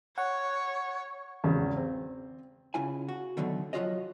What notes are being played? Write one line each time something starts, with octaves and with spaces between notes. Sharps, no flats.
C#5 F#5
G#1 E2 C#3
C4
C#3 E4 F4 G#5
F#4
B2 D3 D#3 F#3 A3
F3 F#3 F4 F#4 C#5 D#5